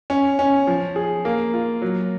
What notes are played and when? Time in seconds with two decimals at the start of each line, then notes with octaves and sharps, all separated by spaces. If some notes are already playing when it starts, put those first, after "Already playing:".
0.10 C#4
0.39 C#4
0.67 F3
0.96 G#4
1.25 A#3
1.54 F4
1.82 F#3